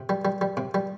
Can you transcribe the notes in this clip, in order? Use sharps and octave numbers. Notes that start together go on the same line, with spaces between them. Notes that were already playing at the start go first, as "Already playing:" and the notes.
Already playing: C3
G3
G3
G3
C3
G3